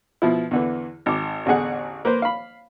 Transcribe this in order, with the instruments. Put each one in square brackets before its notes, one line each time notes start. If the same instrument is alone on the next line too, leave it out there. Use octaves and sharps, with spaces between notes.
[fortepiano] B2 F3 E4
E2 D3 E3
G#1 D6
A1 E2 D3 G#4 F#5
A#3 B4 C5
F5 B5